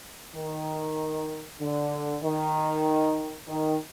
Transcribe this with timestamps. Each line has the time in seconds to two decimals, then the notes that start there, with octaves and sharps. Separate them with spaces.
0.35 D#3
1.60 D3
2.22 D#3
3.47 D#3